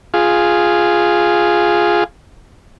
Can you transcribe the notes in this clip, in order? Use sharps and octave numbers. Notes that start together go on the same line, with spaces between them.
F4 G#4